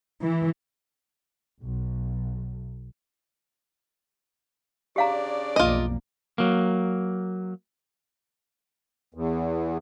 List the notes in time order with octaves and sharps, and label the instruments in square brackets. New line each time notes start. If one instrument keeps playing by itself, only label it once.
[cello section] E3
[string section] B1
[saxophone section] C#3 D4 D5 [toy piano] G4 F5 A#5
[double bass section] B1 F2 A#3 [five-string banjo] F4 D#5
[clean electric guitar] F#3 A#3
[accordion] E2